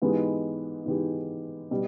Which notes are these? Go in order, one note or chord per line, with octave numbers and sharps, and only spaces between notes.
G#2 E3 G#3 B3 G4
G#2 E3 G#3 B3 G4
B2 G3